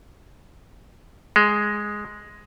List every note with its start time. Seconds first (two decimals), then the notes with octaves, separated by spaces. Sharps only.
1.36 G#3